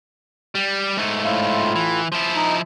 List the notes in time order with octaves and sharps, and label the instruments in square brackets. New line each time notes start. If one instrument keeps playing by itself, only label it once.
[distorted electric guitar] G3
G#2 A3
[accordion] A2 E4 F4
[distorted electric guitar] E3
F3 E4
[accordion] D#4